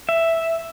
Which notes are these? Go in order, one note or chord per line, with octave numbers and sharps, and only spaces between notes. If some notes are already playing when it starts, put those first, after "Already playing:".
E5